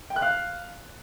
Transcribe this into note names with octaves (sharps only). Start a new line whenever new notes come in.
G5
F#6
F5